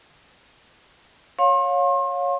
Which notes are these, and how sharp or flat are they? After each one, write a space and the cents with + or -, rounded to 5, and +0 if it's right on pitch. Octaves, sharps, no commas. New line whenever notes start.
C#5 +0 F5 +30 C6 +40